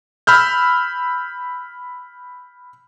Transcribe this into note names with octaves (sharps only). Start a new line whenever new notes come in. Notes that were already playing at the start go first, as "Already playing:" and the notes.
B5 E6 F6 G6